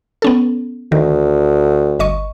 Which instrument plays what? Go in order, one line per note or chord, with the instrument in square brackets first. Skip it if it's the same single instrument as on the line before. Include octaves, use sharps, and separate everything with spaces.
[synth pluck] B3 C#4 A4
[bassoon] D2 [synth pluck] D#3
[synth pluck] G1 D#5 C#6